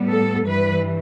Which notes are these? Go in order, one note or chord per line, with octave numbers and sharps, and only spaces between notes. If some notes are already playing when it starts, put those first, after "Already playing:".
Already playing: A2 G3 B3
A4
G2 E3 G3 B4